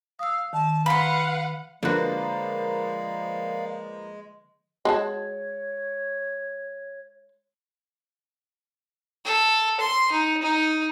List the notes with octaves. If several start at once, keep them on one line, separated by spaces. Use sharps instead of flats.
F5 D#6 E6
D#3 A5
B4 F5 F#5 B5 C6
D3 F3 G#3 A#3 F#4 B4 D5 F5
G#3 F#4 C#5 A5
A4
C6
D#4
D#4